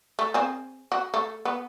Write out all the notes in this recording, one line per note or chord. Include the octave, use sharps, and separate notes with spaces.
A3
C4 G#4
F#4
A3
B3